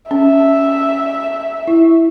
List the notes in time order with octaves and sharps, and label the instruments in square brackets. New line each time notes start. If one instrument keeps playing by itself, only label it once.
[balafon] C#4 [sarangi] E5
[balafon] E4